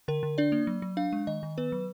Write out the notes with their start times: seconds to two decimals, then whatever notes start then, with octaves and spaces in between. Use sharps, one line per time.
0.08 D3 A#4
0.23 D3
0.38 D4 D5
0.52 A#3
0.67 F#3
0.82 F#3
0.97 D4 F5
1.13 G#3
1.27 D#3 D#5
1.43 D#3
1.58 B3 B4
1.72 F#3